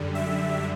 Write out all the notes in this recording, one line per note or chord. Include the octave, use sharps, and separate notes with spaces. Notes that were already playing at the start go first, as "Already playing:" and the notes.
Already playing: F#2 D3 G3
E5